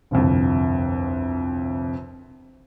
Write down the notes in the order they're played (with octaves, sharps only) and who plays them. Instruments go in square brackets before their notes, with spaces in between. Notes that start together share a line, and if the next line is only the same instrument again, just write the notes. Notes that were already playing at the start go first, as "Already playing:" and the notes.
[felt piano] G1 C2 F2